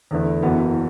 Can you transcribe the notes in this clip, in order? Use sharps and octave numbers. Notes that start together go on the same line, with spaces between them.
E2 D3 A3 E4 B4
F#1 F#2 E3 B3 F#4